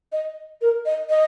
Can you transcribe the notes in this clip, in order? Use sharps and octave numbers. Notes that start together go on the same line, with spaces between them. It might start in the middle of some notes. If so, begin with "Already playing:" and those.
D#5
A#4
D#5
D#5